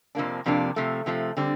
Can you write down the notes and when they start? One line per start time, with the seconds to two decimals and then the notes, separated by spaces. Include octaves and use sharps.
0.15 F2 C3 F3 A#3 D4
0.46 F2 C3 F3 A#3 D4
0.76 C3 F3 A3
1.06 C3 F3 A3
1.37 D3 G3 C4